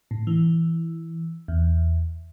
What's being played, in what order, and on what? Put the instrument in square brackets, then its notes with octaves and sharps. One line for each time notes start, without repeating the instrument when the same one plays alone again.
[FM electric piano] A2
E3
E2